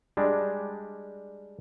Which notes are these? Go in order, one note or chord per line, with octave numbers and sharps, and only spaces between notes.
G3 G#3 D4